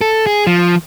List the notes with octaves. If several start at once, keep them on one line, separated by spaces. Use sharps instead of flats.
A4
G#4
F3